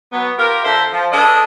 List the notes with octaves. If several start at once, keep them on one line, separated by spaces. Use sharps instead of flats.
F#3 B3
F4 G4 A#4
D3 C5 E5
F3
D4 G#4 A4 B4 D#5